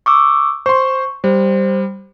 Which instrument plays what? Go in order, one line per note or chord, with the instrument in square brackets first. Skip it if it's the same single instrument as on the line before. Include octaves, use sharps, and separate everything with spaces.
[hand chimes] C#6 D6 E6
[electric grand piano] C5 C6 [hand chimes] C#6
[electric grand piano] G3 [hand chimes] C5